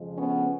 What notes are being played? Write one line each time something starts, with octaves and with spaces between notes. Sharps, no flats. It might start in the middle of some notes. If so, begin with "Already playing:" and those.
Already playing: F2 C#3 F3 G#3
B3 C#4